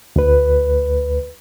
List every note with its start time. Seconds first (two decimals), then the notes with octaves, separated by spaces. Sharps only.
0.16 D2 B4